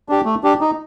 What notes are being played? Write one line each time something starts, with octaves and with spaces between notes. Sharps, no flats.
D4 G4
A3
D4 G4
D#4